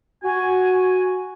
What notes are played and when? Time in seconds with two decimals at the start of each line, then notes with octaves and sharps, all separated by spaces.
0.23 F#4 G#5